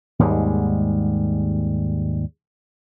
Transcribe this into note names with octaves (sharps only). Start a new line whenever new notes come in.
D#2 G#2 G3 G#3